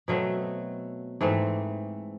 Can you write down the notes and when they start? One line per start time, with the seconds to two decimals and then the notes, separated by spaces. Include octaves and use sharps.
0.08 B2 F#3 A3 C4
1.21 G#2 E3 A3 C4